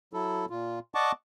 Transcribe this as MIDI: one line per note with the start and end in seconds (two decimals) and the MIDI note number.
0.13 0.46 54
0.13 0.46 64
0.13 0.46 69
0.50 0.79 46
0.50 0.79 65
0.95 1.12 74
0.95 1.12 75
0.95 1.12 78
0.95 1.12 81
0.95 1.12 85
0.95 1.12 86